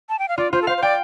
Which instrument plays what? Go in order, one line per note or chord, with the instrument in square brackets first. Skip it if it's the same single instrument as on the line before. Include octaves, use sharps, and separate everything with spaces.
[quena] A5
G5
F5
[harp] F4 [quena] D5
[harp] F4 [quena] C5
[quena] A4
[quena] C5 [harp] F5
[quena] C5
[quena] D5 [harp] G5